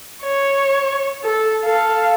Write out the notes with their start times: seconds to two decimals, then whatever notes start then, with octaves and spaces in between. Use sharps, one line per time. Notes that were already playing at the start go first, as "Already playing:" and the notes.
0.22 C#5
1.23 A4
1.64 A4 F5